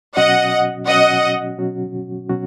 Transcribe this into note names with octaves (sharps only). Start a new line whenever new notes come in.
B2 F#3 C#4 F#4 D#5 F#5
B2 F#3 C#4 F#4 D#5 F#5
B2 F#3 C#4 F#4
B2 F#3 C#4 F#4